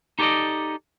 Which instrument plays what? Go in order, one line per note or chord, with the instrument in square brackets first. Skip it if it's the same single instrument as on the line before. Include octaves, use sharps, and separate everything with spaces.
[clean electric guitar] D#4 G4 A4 B4 D5 D#5